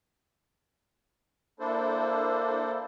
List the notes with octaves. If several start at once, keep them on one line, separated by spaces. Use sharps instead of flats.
A#3 D4 E4 A4 C5